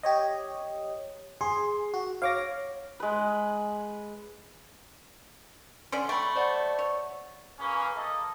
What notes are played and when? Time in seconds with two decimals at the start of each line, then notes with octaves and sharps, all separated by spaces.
0.03 G4 C#5 D#5
1.41 G#4 C6
1.94 F#4
2.22 C#5 F5 D6 A#6
3.00 G#3 B4
5.92 D3 C#4 D5 C6
6.09 A3 G5 B5 C#6
6.36 C5 D5 F#5
6.79 C#5
7.58 A#3 C#4 G#4 B4
7.96 A#3 A4 D#5